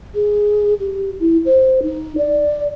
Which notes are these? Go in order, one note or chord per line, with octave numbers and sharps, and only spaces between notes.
G#4
G4
E4
C5
D#4
D5